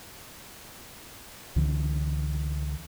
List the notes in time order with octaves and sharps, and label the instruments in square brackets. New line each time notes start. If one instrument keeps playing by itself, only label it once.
[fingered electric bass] C#2 D3 E3